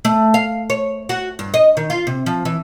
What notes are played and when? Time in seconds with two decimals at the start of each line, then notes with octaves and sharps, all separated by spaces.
0.05 A3
0.34 F5
0.70 C#5
1.09 F#4
1.39 G2
1.54 D#5
1.77 D#3
1.90 F4
2.07 C3
2.26 F3
2.45 E3